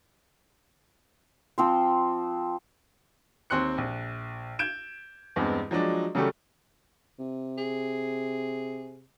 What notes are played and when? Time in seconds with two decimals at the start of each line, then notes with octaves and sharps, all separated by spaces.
1.58 F3 C4 C5
3.50 D#2 C4 C6 F#6 C#7
3.78 A#1
4.59 G6 G#6 D7 E7
5.36 E2 G2 G#3 C4
5.71 F3 F#3 G#3 D4
6.15 C#3 F#3 G3 A3 G4 A4
7.19 C3
7.58 G#4